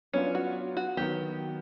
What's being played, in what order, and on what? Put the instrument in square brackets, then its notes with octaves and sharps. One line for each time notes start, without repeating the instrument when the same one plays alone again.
[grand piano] F#3 B3 D4 F4 [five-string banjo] C#4
[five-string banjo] F#4
F#4
[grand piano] D#3 F#3 B3 [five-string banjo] G4